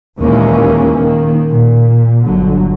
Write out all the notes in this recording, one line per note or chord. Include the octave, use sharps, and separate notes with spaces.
D#2 A#2 E3 G#3 A#3 C#4
D#3 A#3
A#2
G1 D3 F#3